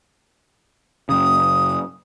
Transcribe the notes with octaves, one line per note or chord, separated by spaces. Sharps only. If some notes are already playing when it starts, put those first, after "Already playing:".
F#2 C#3 D#6